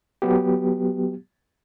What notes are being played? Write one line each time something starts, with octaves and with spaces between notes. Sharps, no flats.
F#3 B3 G4